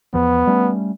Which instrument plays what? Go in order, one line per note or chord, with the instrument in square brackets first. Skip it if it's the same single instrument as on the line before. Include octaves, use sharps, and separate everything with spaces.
[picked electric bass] E2 F3 [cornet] B3
[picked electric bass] G3 A3 C#4